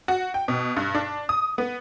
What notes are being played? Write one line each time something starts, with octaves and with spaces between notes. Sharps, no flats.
F#4
G5
B2
G2
D4
D#6
B3